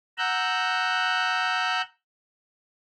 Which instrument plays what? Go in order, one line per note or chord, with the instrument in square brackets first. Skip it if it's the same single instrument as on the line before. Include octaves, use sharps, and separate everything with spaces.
[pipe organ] F#5 A#5 E6 F#6 G6